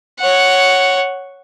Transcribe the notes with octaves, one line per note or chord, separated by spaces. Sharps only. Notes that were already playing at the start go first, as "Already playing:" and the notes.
C#5 F#5